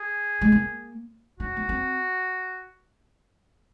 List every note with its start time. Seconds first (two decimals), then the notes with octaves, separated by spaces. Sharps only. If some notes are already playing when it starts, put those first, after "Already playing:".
Already playing: G#4
0.41 G#3
0.52 A#3
1.39 C#4 F#4
1.56 A#3
1.69 C4